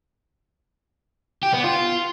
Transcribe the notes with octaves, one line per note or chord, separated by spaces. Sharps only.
G4
B3
F4